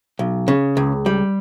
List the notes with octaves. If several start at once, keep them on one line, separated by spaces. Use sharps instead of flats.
B1
C#3
C#2
G3